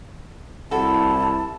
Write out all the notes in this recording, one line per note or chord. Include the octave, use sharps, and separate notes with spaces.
C2 E4 F#4 A4 A5